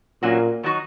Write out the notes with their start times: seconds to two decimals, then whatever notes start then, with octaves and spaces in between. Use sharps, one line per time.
0.23 A#2 F#3 A#3 C#4 F#4
0.63 D#3 F#3 D#4 F#4